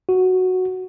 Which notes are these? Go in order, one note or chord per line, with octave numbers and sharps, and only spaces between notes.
F#4